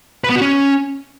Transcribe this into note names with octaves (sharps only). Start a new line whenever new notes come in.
B4
B3
F#4
C#4